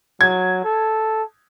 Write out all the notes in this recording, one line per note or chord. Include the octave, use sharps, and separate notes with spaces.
F#3 G#6
A4